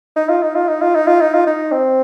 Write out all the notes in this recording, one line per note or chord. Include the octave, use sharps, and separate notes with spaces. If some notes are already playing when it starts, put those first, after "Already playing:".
D#4
F4
D#4
F4
D#4
F4
D#4
F4
D#4
F4
D#4
C4